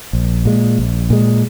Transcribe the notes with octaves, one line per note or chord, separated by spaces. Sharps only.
A#1
A#2 G#3
A#1
A#2 G#3